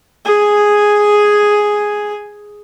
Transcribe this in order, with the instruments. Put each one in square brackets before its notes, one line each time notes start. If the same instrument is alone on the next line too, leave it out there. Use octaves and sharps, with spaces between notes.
[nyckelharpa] G#4 G#5